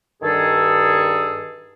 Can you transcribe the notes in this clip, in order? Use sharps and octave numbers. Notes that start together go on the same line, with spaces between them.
G2 D#3 G#4 A4